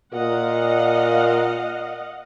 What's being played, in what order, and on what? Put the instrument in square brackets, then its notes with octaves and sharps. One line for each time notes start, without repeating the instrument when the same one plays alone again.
[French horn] A#2 [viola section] D#5 F5 F#5